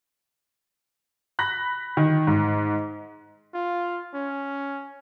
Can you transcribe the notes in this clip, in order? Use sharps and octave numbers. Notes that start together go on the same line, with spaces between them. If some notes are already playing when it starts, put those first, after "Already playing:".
B5 F#6 A#6
D#3
G#2
F4
C#4